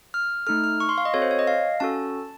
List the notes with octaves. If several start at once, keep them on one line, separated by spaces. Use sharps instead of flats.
F6
A3 D#4 A4 F6
F6
C#6
C6
F5
D#5
C4 F#4 A4 C#5
C5
C#5
D#5
F5
C#4 F#4 A4 A5